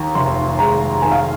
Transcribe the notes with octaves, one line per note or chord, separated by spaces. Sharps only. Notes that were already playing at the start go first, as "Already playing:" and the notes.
Already playing: D#2 A#5
F1 C6
G#3 A#5
D#3 G#5
F5